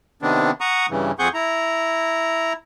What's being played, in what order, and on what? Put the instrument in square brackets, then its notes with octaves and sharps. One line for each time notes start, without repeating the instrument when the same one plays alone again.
[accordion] C3 D#3 B3 C4 D4
F#5 A#5 C#6 D#6
G2 C#3 E3
F2 C4 G#4 F#5 C#6 G6
E4 A#5